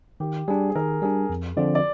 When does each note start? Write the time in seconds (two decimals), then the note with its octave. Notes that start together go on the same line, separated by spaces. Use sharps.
0.20 D#3 G4
0.48 G3 D4 G#4
0.70 G#4
0.76 D#3 A#4
1.02 G3 D4 G#4
1.30 F2
1.57 D3 F3 C4 F4 D5
1.75 D5